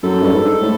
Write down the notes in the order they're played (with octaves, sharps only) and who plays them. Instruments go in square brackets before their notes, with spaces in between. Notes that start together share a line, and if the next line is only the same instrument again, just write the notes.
[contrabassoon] F#2 [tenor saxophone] A4
[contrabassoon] G2
G#2
A2